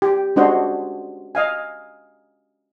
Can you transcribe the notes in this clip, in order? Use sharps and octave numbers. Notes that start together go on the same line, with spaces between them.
G4
G#3 C#4 D4 F#4 C5 D#5
D#5 F5 G#5